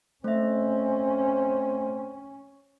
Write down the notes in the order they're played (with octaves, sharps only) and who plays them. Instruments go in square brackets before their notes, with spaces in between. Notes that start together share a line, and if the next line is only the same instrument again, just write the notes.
[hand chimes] A3 E5 [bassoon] C4 [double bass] C#4